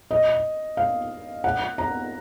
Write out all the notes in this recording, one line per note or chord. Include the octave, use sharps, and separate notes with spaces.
D#5
F5
F#5
A#5